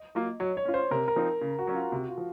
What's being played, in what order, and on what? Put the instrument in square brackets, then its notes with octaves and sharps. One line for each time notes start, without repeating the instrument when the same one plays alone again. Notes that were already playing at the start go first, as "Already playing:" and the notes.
Already playing: [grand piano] D#5
[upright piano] F#3 A#3 F4
[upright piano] F#3 [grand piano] C#5
[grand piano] C#5
[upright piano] C#4 F4
[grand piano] C5
[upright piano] C3 [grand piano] A#4
[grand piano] A#4
[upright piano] F3 C4 D#4
C#3
[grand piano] F#4
[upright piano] F#3 C#4
[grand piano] F4
[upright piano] C3 [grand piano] F#4
[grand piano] F4
[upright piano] F3